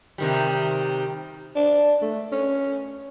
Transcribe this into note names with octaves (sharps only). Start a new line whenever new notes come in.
C3 D#3 G3
D4
A3
C#4